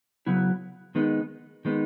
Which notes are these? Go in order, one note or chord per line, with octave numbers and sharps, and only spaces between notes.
C#3 F#3 B3 E4
D#3 G#3 B3 D#4
D#3 G#3 B3 D#4